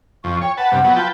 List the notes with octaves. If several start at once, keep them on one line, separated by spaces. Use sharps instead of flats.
F2 C#6
C#5 G5
B4 F#5 A5
G2 C3
F#3 B3
F4 B4 G5 A5